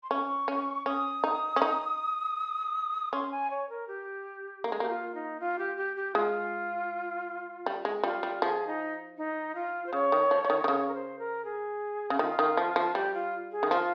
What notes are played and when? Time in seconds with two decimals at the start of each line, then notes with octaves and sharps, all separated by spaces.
0.03 C6
0.10 C#4 C#6
0.48 C#4
0.86 C#4 D#6
1.24 D#4
1.56 C#4
1.62 D#4
3.13 C#4 C6
3.32 G#5
3.51 C#5
3.70 A#4
3.88 G4
4.64 A#3
4.72 G#3
4.80 A#3 G4
4.89 F4
5.15 D#4
5.40 F4
5.59 G4
5.77 G4
5.96 G4
6.15 G#3 F4
7.66 G3
7.85 G#3
8.03 G3 F4
8.23 G3
8.42 F3 G#4
8.67 D#4
9.17 D#4
9.55 F4
9.86 C5
9.93 C#3 C#5
10.12 D#3
10.31 F3
10.45 F3
10.50 D#3
10.64 D#3
10.68 C#3 C#5
10.88 A#4
10.94 C5
11.19 A#4
11.45 G#4
12.10 C#3
12.19 D#3 F4
12.39 D#3
12.57 F3
12.76 F3
12.95 G3 G4
13.14 F4
13.52 G#4
13.63 D#3
13.71 F3 F4